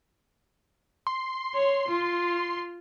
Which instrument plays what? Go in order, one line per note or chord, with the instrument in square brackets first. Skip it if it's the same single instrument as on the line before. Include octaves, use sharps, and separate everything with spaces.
[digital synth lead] C6
[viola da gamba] C#5
F4